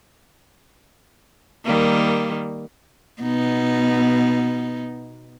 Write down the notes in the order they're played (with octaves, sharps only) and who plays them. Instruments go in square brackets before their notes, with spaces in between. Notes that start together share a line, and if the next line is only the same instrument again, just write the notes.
[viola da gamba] D#3 G3 A#3
B2 B3 D#4